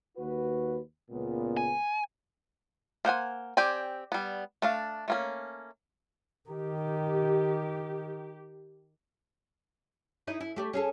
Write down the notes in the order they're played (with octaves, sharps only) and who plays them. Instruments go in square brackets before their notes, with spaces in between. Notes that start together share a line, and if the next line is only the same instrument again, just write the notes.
[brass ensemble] D#2 F#4 B4
C#2 A#2 B3
[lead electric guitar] G#5
[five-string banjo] A#3 C5 F#5 G#5
C4 G4 D5 G#5
G3 B3
A3 D4 F5
A3 A#3 C#4
[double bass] D#3 [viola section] G4
[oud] D#4 E4 D#5
E4
A3 G4 D5
C#4 G#4 A4